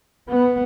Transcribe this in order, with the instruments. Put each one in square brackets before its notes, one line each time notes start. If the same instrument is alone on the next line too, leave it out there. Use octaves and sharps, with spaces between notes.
[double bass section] B3